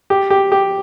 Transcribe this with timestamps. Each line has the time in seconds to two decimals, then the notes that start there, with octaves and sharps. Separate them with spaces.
0.10 G4
0.30 G4
0.52 G4